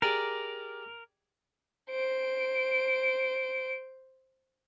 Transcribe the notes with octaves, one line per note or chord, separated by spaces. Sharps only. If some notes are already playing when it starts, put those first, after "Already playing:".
G4 G#4 A#4 D5
C5 D7